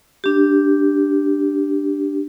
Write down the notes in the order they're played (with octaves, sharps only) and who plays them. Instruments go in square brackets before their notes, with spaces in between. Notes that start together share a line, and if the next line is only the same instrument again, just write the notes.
[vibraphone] D4 G4